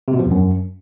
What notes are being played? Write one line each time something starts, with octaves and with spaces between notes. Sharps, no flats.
C3
B2
F3
E2
F#2